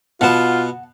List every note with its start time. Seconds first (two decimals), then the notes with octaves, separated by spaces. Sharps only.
0.21 B2 B3 F4 F#5 A5